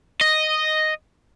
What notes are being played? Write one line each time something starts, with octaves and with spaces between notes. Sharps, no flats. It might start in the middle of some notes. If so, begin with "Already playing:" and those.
D#5